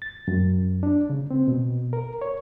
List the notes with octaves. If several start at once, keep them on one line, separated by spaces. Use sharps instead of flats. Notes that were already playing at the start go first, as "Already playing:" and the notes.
A6
F#2
D4
C#3
C4
B2
A#4
C#5